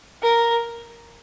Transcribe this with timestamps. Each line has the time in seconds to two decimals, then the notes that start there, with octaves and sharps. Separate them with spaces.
0.22 A#4